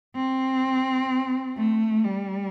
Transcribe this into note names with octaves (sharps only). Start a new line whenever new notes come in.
C4
A3
G3